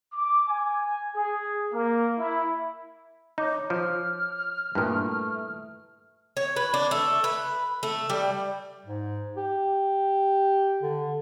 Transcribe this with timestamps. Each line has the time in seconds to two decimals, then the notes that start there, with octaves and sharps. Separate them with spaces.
0.13 D6
0.48 G#5
1.15 G#4
1.72 A#3
2.18 E4
3.38 D#4 C#5 D6 G6
3.70 F3 F6
4.75 G2 A#2 A3 E4 B4 D#6
6.37 C#5
6.56 B4
6.74 D4
6.91 A3
7.24 B4
7.83 A3
8.10 G3
8.86 G#2
9.37 G4
10.83 D3